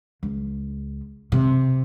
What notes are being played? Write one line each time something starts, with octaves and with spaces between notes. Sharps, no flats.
C#2
C3